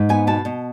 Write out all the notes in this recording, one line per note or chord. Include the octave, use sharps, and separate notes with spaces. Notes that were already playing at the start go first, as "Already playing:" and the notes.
Already playing: G#2
B3 G#5
B2 A5
B2